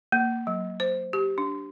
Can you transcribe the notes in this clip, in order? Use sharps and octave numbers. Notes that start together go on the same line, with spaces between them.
A#3
F#3
C5
G4
D4